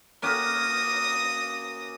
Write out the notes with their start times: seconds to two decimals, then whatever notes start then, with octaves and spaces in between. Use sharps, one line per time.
0.22 A#3 C#4 F#4 D#6 A#6